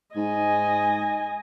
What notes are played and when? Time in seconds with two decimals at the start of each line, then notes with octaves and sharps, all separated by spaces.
0.16 G#2 D#5 G#5